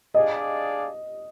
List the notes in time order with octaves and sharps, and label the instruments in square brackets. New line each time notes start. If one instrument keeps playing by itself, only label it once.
[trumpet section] D4 G#4 D5 F5 [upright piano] D#5